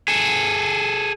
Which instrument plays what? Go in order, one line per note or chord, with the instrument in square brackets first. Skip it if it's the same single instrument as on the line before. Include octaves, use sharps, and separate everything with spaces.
[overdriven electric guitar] G#4 A4